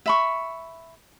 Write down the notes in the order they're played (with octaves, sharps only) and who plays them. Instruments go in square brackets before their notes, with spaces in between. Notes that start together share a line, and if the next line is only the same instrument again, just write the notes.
[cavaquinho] E5 B5 C#6